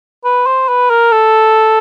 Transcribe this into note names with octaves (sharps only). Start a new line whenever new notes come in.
B4
C5
B4
A#4
A4